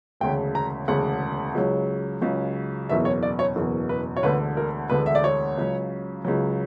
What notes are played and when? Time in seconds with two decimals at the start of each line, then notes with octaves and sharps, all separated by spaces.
0.21 E1 D2 C#3 G5
0.55 A#5
0.88 E1 D2 C#3 F#5
1.54 C#2 C#3 F#3
2.21 C#2 C#3 F#3
2.89 F#1 E2 B2 E5
3.05 C#5
3.23 D5
3.39 C#5
3.56 F#1 E2 B2
3.89 B4
4.17 C#5
4.23 E1 D2 D3 B4
4.57 A#4
4.90 E1 D2 D3 B4
5.06 E5
5.15 D5
5.24 C#5
5.57 C#2 C#3 F#3
6.25 C#2 C#3 F#3